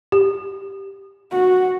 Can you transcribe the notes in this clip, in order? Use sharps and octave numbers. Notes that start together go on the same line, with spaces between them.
G4
F#4